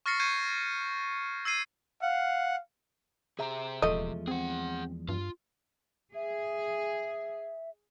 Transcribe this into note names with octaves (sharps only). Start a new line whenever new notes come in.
C#6 F6 A6 A#6 C7 C#7
C#6 G6 G#6 C7 C#7 D#7
E6 G#6 C7 D#7
F5 F#5
C3 G4 G#4 E5 A#5
D#1 E2 F3 G#3 A3 D#5
C4 G#4 F#5
G2 F4
G#4 E5